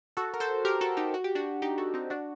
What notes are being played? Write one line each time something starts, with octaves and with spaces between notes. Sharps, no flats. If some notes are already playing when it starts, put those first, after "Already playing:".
F#4 A4
A#4
A4 C5
G4 A#4
F#4 A4
D#4 G4
F#4
G4
D4 F#4
D#4 G4
F#4 A4
C4 D#4
D4 F#4